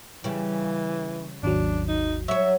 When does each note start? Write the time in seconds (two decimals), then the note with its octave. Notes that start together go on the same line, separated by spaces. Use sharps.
0.24 C#3 E3 G3
1.43 G#1 D#2 F#3 D4
1.88 D#4
2.28 F#3 C#5 E5